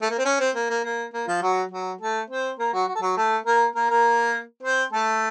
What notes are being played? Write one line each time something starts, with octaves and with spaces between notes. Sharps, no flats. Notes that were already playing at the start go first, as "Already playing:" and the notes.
A3
A#3
C4
C#4
C4
A#3
A#3
A#3
A#3
F3 F4
F#3 F#4
F#3 F#4
A3 A4
C4 C5
A#3 A#4
F#3 F#4
F#4
A4
F#3 F#4
A3 A4
A#3 A#4
A#3 A#4
A#3 A#4
C4 C5
A3 A4